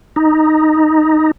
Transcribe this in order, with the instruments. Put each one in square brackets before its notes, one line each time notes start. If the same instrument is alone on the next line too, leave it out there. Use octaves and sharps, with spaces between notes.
[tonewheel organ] D#4